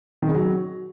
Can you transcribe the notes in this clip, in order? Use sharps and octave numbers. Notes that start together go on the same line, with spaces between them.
D#3
C#3
F#3